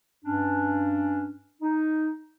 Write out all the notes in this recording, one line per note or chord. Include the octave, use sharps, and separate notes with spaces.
G2 C#4 D4
D#4